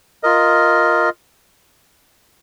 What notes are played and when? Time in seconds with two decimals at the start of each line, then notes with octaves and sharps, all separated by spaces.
0.23 F4 A#4 D#5